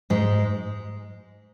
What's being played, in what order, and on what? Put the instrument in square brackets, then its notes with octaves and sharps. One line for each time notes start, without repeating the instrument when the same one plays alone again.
[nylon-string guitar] G#2 G#3